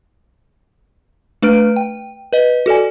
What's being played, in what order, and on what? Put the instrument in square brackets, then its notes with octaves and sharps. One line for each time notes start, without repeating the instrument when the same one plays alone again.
[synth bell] A3 D4 B4 F6 D7
G5
B4 D#5
F#4 A4 D5 G#5